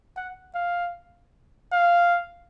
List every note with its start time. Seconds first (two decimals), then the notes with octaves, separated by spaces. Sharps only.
0.17 F#5
0.55 F5
1.72 F5